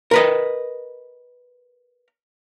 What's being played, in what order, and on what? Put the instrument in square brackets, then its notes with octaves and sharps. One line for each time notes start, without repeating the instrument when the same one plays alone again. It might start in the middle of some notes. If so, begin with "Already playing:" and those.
[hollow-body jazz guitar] A#4 B4 D#5